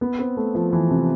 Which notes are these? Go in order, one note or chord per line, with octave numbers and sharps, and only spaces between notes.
B3
C4
A3
F3
E3
C3